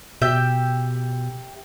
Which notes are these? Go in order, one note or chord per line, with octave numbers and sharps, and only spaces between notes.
B2 G4 E5 G5